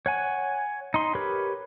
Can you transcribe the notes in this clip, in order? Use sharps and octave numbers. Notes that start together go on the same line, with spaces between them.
C#5 F#5 G#5
D#4 C6
G4 A#4 B4 C#5 B5